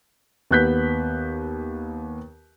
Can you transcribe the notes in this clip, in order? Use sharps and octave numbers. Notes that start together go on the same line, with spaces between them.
D#2 B3 F#6 G6 B6